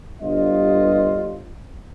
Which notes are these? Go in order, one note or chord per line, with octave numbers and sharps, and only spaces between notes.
G1 G2 F4 D#5